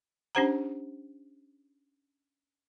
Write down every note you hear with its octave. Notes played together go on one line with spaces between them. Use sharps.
C#4 D4 G4 C5 F#5 A#5